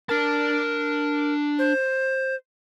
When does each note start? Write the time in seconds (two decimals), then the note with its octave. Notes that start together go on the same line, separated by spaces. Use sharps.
0.09 D4 A#4 A5
1.59 C5